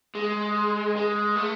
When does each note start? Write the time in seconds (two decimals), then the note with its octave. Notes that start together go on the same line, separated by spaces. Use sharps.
0.15 G#3
0.96 G#3
1.36 A3